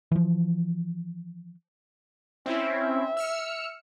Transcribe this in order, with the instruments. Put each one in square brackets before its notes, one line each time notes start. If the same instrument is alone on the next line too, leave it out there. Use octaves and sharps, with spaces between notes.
[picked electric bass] E3 F3
[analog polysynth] C4 C#4 E4 [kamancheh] E5
[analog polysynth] E6 F6 C#7